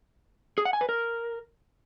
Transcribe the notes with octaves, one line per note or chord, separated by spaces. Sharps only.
G#4
F#5
G#5
B4
A#4